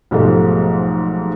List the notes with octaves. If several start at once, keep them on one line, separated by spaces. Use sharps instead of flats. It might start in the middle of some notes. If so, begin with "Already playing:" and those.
B1 G#2 F3 G3 A3